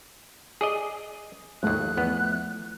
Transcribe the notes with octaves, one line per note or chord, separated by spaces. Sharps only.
G#4 D5 D#5
G#1 D#2 F3 A3 F#6
E2 B3